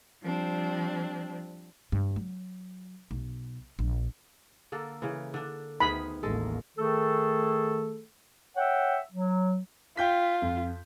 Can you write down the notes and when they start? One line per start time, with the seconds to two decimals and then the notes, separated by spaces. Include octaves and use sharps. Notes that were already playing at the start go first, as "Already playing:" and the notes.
0.22 F3 G3 C4 D4
1.92 G2
2.16 F#3
3.11 B1
3.79 A#1
4.72 D3 A#3 A4
5.02 C#3 E3
5.34 D3 D4
5.80 D2 D#3 B3 G#4 B5
6.23 A1 D#2 G#3 A4
6.77 D#3 A3 G#4 A4
8.57 C#5 E5 F#5 G5
9.11 F#3
9.97 F4 G5 G6 B6
10.42 F2